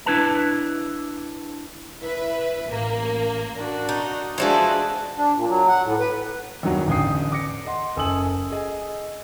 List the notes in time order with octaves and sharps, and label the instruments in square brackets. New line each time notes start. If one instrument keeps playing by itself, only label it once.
[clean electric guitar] D4 E4 B4 A5
[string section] E4 B4 E5
A1 A#3
[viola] D4 F#4
[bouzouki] D#4
[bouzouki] E3 F3 A4 [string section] G#3 D4 [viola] F#4 G#4
[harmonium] D4
A#2
F#3
F#5
A2
B4
[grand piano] E2 G2 D#3 F#3
A1 E2 D3 G5 D#6 C7
D6 A#6 C#7
D#5 F#5 C6
F#1 A4 G#5 D#6 E6 F#7
G#4 D#5 G#5